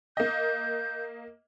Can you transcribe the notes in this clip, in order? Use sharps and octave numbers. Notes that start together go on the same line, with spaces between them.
A#3 D#5 G6